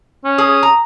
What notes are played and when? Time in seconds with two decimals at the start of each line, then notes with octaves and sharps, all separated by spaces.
0.24 C#4
0.38 G#4 D#6
0.63 A#5